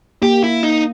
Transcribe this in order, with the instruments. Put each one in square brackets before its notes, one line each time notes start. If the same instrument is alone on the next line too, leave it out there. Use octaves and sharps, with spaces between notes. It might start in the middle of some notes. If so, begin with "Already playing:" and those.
[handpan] A#3 [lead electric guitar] G4
[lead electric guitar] E4
D#4